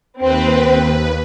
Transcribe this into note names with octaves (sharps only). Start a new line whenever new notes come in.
D#2 C4 B4